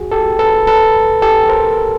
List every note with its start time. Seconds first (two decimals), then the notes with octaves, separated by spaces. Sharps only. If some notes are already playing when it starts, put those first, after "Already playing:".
Already playing: F#4 G#4
0.12 G4 A4
0.39 A4 B4
0.67 A4 B4
1.22 G4 A4
1.49 A#4 C5